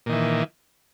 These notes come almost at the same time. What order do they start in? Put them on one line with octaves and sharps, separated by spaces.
A#2 D#3 E3